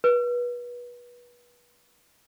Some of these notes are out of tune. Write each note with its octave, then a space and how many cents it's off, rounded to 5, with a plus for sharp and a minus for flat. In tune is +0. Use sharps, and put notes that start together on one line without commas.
B4 -30